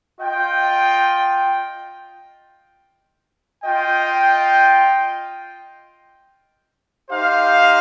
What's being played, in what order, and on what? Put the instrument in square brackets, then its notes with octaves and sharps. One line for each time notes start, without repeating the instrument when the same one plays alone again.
[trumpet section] F4 D#5 G5
F4 D#5 G5
D#4 G4 C5 F5